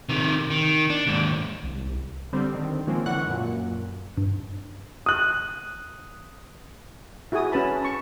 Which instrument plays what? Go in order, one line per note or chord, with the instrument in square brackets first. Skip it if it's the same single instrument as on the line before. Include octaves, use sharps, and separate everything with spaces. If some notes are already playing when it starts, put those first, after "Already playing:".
[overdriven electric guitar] C3 D#3
D#3
D4
D#2 G#2
[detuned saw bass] C2
[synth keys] D3 G3 C4
D3 D#3 C4
D#3 F3 G#3 A#3 C4 C#4
D3 E3 F#5 C#6 F#6
F#2 A#2
[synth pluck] G2
[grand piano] D#6 F#6
[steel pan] E4 F#4 G#4 G#5 D#6
C#4 B4 A5 B5
A5 C#6